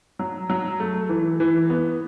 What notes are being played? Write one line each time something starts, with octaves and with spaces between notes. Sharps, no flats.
F#3
F#3
A3
E3
E3
B3